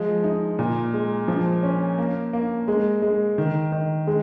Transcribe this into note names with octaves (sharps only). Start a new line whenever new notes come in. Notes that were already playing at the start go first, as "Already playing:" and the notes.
Already playing: F3 G#3
D#4
A#2
G#3
F3
C#4
A#3
A#3
G#3
G#3
D#3
D#3
G#3